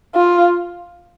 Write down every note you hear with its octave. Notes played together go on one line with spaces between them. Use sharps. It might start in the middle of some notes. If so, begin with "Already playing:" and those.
F4